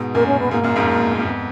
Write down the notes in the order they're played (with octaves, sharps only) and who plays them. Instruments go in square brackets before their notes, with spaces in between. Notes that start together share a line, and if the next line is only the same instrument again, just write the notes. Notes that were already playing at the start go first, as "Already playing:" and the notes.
Already playing: [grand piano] G#2 B2
[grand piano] F#2 A#2 [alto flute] A#4
[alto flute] C#4
B3
[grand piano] G#2 B2 [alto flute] A#3
[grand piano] F#2 A#2
F2 G#2
F#2
[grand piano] F#2 [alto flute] A#3
[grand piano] F2 G#2 [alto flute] B3